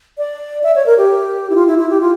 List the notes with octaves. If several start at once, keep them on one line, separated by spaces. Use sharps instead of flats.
D5
E5
C#5
A#4
G4
E4
F4
E4
E4
G4
F4